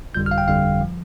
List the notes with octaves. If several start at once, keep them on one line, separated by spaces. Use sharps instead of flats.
G1 F2 D3 G3 G6
F6
F5
G5
G1 F2 D3 G3 F5
F3